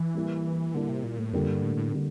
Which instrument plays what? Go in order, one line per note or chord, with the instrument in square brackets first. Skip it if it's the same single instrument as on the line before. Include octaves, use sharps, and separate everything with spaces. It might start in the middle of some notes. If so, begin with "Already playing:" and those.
Already playing: [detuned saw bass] E3
[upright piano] G3 A#3 E4
[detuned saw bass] D3 [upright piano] G3 A#3 E4
[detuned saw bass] C3
A#2
A2
[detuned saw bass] F2 [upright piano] D3 G3 A#3
[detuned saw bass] G2
A2
A2
[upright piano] D3 G3 A#3